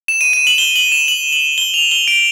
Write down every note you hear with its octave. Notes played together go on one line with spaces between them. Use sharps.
E7
D#7
D#7
F#7
G7
F#7
E7
F#7
F#7
G7
F7
G7
D7